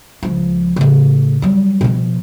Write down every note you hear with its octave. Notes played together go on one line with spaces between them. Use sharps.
C#2 F3
A2 C#3
F#3 G3
B2 F3